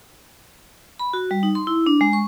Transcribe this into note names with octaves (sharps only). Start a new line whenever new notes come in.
B5
F#4
G3
D#4
C6
E4
D4
G#3
C#6